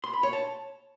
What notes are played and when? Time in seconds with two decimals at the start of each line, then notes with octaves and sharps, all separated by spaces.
0.04 C6
0.13 B5
0.23 C#5
0.33 A5